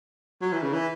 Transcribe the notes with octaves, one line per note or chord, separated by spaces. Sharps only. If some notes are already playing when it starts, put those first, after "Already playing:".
F#3
E3
C#3
E3